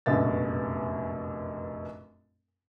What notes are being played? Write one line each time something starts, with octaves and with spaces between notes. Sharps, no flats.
F1 A#1 F#2 B2 A6